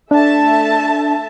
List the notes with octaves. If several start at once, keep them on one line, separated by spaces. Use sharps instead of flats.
A3 D4 E5 A5